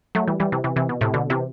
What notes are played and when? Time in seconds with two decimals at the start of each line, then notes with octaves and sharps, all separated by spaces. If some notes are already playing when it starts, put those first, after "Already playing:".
0.15 F#3 A3
0.28 E3 G3
0.40 E3 G3
0.52 C3 E3
0.64 C3 E3
0.76 C3 E3
0.89 B2
1.01 A2 C3
1.14 B2 D3
1.30 C3 E3